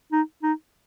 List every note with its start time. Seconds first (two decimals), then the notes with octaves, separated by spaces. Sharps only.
0.12 D#4
0.43 D#4